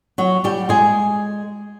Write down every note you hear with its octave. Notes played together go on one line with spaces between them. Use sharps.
F#3 F#4
G3 G4
G#3 G#4